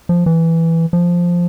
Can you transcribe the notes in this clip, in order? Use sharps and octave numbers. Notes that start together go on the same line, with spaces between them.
F3
E3
F3